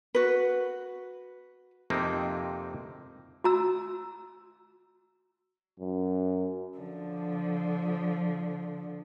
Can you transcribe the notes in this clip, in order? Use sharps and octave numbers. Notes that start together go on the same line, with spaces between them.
F#4 B4
F2 C3 A#3 C4 D#4
F#4 A#5 E6
F#2
D3 F3